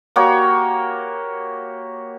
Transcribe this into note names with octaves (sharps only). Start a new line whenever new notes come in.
A#3 F#4 G4 C#5